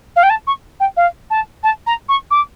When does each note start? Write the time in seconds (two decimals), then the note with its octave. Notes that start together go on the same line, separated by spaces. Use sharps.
0.16 F5
0.23 G5
0.30 A5
0.47 C#6
0.80 G5
0.96 F5
1.30 A5
1.63 A5
1.86 A#5
2.08 C#6
2.30 D6